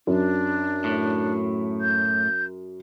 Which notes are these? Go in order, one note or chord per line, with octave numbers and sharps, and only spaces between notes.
F#2 D4
A2
G6